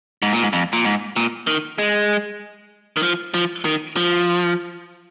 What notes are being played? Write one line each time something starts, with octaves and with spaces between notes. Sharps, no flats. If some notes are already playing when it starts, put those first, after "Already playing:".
G#2
A#2
G#2
F2
A#2
G#2
A#2
D#3
G#3
D#3
F3
F3
D#3
F3